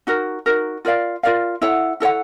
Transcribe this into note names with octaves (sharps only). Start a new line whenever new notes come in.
D#4 F#4 A#4
D#4 F#4 A#4
F4 A#4 D5 F5
F4 A#4 D5 F5
E4 A4 C#5 F#5
E4 A4 C#5 F#5